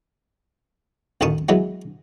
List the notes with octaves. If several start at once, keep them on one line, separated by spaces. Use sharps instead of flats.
A1 D2 D#3 A5 C#6 D#6
E3 F#3 G#3 B3